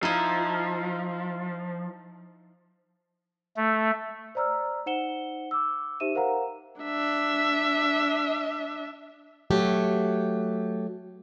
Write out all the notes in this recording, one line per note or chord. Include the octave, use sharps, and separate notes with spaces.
F3 D#4 E4
A3
C5 D5 A#5 E6 F6
D#4 C5 F#5 C#7 E7 G7
D6 E6
D#4 G4 C5 E5 D#7 E7
A#4 C5 F5 F#5 A#5
D4 E5
F#3 A3 G4